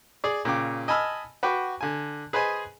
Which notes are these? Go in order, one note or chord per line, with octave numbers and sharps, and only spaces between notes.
G#4 D5
A#2 C#3 G5 D6
D#5 G#5 A5 B5 E6 F6
F#4 B4 G5 D6
D3 G#5
G#4 B4 C5 D#5 G#5